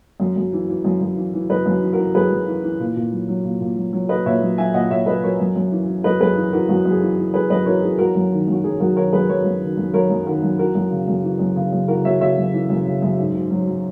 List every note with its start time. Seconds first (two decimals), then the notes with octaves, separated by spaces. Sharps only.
0.20 F#2
0.36 F#2
0.53 E3
0.69 E3
0.85 F#2
1.01 F#2
1.17 E3
1.34 E3
1.50 F#2 B4 D#5
1.66 F#2
1.82 E3
1.93 F#4 A#4
1.98 E3
2.15 F#2 G#4 B4
2.30 F#2
2.47 E3
2.63 E3
2.80 A#2
2.96 A#2
3.12 F#3
3.28 F#3
3.44 A#2
3.61 A#2
3.77 F#3
3.93 F#3
4.09 A#2 B4 D#5
4.26 A#2 C#5 E5
4.42 F#3
4.58 F#3 E5 G#5
4.74 A#2 D#5 F#5
4.90 A#2 C#5 E5
5.06 F#3 B4 D#5
5.23 F#3 A#4 C#5
5.40 F#2
5.55 F#2
5.72 E3
5.88 E3
6.04 F#2 B4 D#5
6.20 F#2 G#4 B4
6.36 E3
6.52 E3 F#4 A#4
6.69 F#2 F#4
6.85 F#2
6.91 G#4
7.01 E3
7.18 E3
7.34 F#2 G#4 B4
7.50 F#2 B4 D#5
7.66 E3 A#4 C#5
7.82 E3 G#4
7.98 F#3 F#4 A#4
8.15 F#2
8.31 D#3
8.48 F#2 F#4
8.64 F#3 G#4
8.80 F#2 F#4 A#4
8.96 D#3 A#4 C#5
9.12 F#2 G#4 B4
9.29 F#3 A#4 C#5
9.45 F#2
9.62 D#3
9.77 F#2
9.94 F#3 A#4 C#5
10.10 F#2
10.26 D#3 F#4 A#4
10.43 F#2
10.58 E3 F#4 A#4
10.75 F#2
10.91 C#3
11.08 F#2
11.23 E3
11.39 F#2
11.56 C#3
11.72 F#2
11.88 E3 F#4 A#4
12.04 F#2 C#5 E5
12.21 C#3 C#5 E5
12.37 F#2
12.53 E3
12.70 F#2
12.86 C#3
13.02 F#2
13.18 G#2
13.34 G#2
13.51 F#3
13.67 F#3